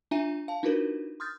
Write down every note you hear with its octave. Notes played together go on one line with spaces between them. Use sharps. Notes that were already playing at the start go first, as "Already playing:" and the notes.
D4 F4 E5 G#5 A#5 D#7
F5 A5
D4 D#4 F4 F#4 A#4 B4
C6 D#6 F6 G6 A6